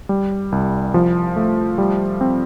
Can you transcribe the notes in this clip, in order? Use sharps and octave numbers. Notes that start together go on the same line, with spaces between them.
G3
C2
F3
A3
G3
C4